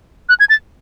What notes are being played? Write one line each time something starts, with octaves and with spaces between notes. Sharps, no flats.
F#6
G#6
A6